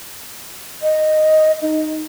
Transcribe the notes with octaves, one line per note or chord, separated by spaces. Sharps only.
D#5
D#4